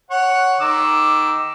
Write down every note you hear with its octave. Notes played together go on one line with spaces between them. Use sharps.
C#5 F#5
D#3 D6 E6